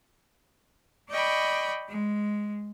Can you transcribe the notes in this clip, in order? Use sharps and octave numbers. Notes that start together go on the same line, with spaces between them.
D5 D#5 G5 B5 C#6
G#3